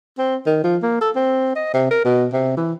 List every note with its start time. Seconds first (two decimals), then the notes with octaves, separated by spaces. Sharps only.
0.18 C4
0.46 D#3
0.64 F3
0.83 A#3
1.01 A4
1.16 C4
1.56 D#5
1.74 C3
1.91 A#4
2.05 B2
2.33 C3
2.57 E3